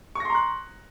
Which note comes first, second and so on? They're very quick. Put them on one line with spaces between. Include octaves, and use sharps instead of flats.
C#6 A#6 C6 A#5 F#6